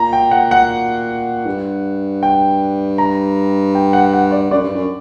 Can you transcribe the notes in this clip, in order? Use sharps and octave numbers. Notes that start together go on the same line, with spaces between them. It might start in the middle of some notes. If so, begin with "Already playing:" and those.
Already playing: A#2 A#5
G5
F#5
F#5
G2
G5
A#5
G5
F#5
F#5
D5
F#2 D5
G2
F#2